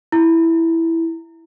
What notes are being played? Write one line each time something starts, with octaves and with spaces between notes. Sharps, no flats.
E4